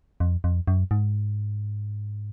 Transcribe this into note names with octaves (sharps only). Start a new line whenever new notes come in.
F2
F2
F#2
G#2